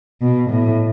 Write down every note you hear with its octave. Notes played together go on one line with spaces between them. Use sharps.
B2
A2